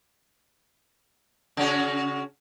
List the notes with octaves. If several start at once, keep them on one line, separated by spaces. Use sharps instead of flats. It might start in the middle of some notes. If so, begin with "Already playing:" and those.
C#3 C#4 F#4